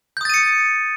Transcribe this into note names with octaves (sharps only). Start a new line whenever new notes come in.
D#6 G6 A6 C#7 D#7